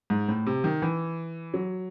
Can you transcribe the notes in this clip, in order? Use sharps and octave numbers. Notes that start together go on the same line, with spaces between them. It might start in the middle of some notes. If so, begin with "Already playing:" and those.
G#2
A2
C3
D#3
E3
F#3